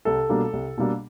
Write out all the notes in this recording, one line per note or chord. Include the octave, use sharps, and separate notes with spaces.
C2 A4
B2 G3 A#3 D4
C2
B2 G3 A#3 D4